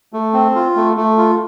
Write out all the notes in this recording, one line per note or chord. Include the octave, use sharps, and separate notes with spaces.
A3
C4
F4
A3
A3
F4